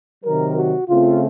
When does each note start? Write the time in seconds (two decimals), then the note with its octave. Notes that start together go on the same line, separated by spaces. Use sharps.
0.24 C3 D#3 F#3 A#4
0.56 F#4
0.88 C#3 A3 C4 F4